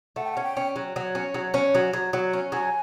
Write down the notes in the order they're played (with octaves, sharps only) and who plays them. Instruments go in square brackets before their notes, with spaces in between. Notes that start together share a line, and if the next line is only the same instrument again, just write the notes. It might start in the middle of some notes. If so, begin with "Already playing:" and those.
[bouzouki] A3 [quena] F#5
[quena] G5
F#5
[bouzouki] C#4
[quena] G5
[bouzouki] C#4
F#3
F#3
C#4
F#3
C#4
F#3
F#3
F#3
C#4
[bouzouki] F#3 [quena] G#5